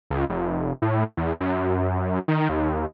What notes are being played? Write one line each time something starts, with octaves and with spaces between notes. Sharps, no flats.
C#2
F1
A2
E2
F#2
D#3
D#2